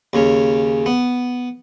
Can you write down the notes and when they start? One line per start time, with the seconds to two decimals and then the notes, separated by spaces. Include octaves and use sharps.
0.13 D#2 C#3 C#4
0.86 B3